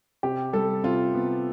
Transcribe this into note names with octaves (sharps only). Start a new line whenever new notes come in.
C3 G4
G3 A4
C3 F4
B3